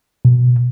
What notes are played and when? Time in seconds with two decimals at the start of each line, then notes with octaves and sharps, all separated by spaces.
0.25 B2